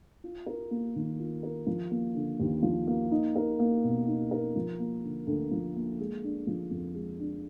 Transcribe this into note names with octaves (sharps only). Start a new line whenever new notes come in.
F4
A#4
A#3
D#3
F4
A#4
F3
A#3
D3
D#2
F3
A#3
D#4
A#4
A#3
B2
D#4
A#4
F3
A#3
D3
D2
F3
A#3
G#3
D4
F3
F2
G#3
D4